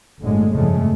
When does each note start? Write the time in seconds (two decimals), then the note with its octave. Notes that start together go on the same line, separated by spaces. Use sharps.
0.21 G1 A2 D3 G#3
0.54 G1 F2 A2 C#3 G#3 A3